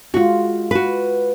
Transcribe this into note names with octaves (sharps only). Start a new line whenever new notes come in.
G#3 F4 F#4
F#4 B4